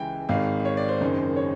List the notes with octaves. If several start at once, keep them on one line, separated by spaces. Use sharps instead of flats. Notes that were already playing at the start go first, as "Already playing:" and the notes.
Already playing: C#2 C#3 E3 G5 G#5
G#1 G#2 D#3 F5
C#5
D5
C5
F#1 F#2 D#3
C#5